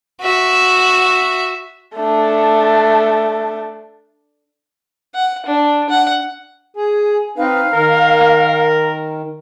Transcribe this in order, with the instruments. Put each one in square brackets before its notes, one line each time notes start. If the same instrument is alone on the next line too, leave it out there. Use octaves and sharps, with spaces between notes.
[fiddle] F#4 E5
[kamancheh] A3 D4
[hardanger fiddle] F#5
D4
F#5
[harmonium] G#4 [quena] G#5
[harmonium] C4 D#4 B4 [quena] F5
[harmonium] D#3 [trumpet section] A#4